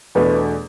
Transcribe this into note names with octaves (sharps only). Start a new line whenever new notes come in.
E2 B2 A3 D4 B4